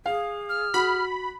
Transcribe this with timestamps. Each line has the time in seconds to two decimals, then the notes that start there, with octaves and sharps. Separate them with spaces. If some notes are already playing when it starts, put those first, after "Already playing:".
0.06 G#4 F5
0.49 F6
0.74 F#4 B5